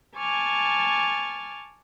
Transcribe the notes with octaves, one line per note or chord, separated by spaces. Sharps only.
G#5 A5 C#6 D6 F6 A6